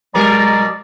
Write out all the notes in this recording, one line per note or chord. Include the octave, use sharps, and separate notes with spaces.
B2 F#3 G#3 A#4 D5 A#5